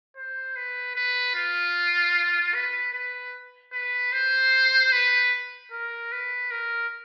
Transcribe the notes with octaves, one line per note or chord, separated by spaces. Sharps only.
C5
B4
B4
F4
B4
B4
B4
C5
B4
A#4
B4
A#4